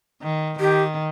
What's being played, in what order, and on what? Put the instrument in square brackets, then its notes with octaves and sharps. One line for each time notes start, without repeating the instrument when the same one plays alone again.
[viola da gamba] D#3
[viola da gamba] D#3 [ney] G4